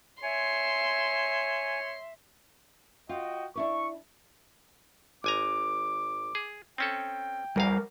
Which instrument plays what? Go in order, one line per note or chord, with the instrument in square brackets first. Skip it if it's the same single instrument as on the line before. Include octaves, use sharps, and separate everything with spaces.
[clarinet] C#5 [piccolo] E5 [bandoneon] G#5 [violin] C6
[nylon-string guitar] F4 [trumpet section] F#4 D#5 G5
[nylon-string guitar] D4 E4 B4 [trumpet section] E5 C#6
[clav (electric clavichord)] G#1 G#5 A#5 [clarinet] D6
[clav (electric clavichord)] G#4
[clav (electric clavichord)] C4 C#4 A4 [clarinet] G5
[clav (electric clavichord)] A#1 E2 F5 [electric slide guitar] G3 A#4